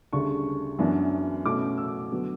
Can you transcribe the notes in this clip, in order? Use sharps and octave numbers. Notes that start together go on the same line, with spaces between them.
D2 C#3 G3 D4 C#6
F#2 E3 B3 D4
B2 A3 C#4 D6
E6
D3 F#3 B3